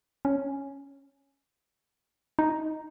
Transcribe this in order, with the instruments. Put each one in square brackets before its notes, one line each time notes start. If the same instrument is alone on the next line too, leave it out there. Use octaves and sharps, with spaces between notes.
[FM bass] C#4
D#4